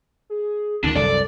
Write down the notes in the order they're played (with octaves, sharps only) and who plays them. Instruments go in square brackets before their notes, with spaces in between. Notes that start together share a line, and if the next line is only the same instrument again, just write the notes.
[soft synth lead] G#4
[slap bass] D2 D#3 [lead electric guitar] D4 [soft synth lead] D#4
[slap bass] C2 F#2 [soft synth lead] A4 [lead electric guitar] D5